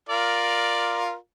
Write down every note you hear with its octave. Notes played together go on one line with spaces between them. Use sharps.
F4 A#4 D5